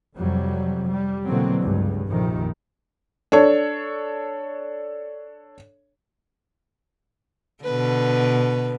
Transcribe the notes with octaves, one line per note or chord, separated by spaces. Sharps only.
F2 C3 F#3 G3
G3
B2 D3 E3 F#3 A#3 C4
C#2 G2
A#1 F2 C3 D#3
D4 A4 C#5
B2 D3 B4